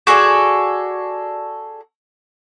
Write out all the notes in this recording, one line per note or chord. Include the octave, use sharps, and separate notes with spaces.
F#4 G#4 A4 D5